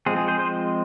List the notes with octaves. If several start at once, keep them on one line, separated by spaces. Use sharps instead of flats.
F3 G#3 C4 G#4
G#4
G#4 C5
C5 D#5